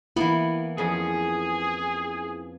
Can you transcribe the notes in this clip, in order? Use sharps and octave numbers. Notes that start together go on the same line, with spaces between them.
E3 A#3 B3 E4
F2 C#4 G#4